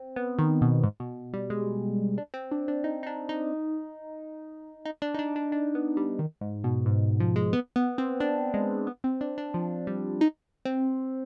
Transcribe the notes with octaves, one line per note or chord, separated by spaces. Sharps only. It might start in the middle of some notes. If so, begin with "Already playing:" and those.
Already playing: C4
B3
D#3
B2
G#2
B2
G3
G#3
D4
C4
D4
D4
D#4
D#4
D4
D#4
D#4
D4
D#4
D4
D4
D4
B3
G3
D#3
G#2
B2
G#2
F3
G#3
B3
B3
C4
D4
G#3
B3
C4
D4
D4
F3
G3
D#4
C4